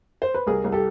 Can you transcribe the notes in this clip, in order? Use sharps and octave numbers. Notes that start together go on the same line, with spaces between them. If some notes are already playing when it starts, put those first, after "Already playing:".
C5
B4
C2 G#4 A#4
C2
G4 A4